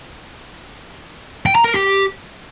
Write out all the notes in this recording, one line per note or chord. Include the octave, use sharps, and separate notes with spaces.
G5
A#5
A#4
G4